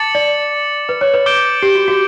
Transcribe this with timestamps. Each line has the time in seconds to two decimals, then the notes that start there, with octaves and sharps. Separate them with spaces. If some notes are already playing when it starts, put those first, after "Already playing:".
Already playing: A5 D6 A6 C#7 F#7
0.15 D5
0.89 B4
1.01 C#5
1.14 B4
1.26 D6 G6 D7 G7
1.62 G4
1.75 F#4
1.88 F#4